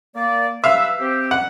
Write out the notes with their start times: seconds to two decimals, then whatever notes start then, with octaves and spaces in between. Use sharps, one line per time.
0.15 A#3 D5
0.64 G2 B4 E5 F5 E6
0.99 C4 G4
1.31 F#5